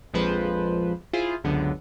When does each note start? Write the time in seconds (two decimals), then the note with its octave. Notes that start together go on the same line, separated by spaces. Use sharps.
0.13 A#1 F2 F3 G#3 B4 C5
1.13 E4 F4 G#4 C5
1.44 C#2 F#2 D3 B3